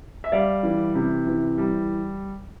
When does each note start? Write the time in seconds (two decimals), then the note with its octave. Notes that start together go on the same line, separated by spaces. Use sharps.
0.24 E5
0.32 G3 D5 F5
0.63 E3
0.95 C3
1.27 E3
1.58 G3